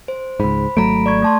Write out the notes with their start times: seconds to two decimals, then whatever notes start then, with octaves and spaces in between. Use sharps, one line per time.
0.08 C5
0.40 C#2 G#2 C5 B5
0.77 G#1 F#3 A3 A#5 B5 D7
1.06 D5 C#6 G#6
1.22 A3 A5 C6